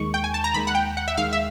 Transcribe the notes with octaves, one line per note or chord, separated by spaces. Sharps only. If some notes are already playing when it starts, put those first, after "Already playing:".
Already playing: D#2 D#3 G#3 C#6
G5
G#5
A5
A#5
D#2 D#3 G#3 B5
F#5
G5
F#5
E5
D#2 D#3 G#3 F5
E5